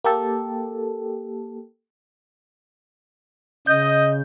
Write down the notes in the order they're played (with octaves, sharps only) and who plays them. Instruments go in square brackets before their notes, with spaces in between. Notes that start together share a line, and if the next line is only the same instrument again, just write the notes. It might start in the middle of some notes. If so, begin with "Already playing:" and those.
[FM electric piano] A#3 G4 A4
[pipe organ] C#3 [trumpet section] D#5 [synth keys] G6